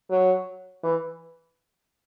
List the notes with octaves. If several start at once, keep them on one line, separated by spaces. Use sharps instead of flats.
F#3
E3